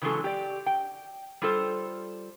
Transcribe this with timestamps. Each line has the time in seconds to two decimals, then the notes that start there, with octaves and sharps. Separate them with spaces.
0.02 C#3 E3 F#3 G#3 C#4 A4
0.24 G4 D5
0.66 G5
1.42 G3 F4 A4 C5